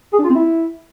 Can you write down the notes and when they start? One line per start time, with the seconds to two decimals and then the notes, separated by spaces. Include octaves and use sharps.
0.13 G#4
0.19 D4
0.24 F4
0.29 C4
0.35 E4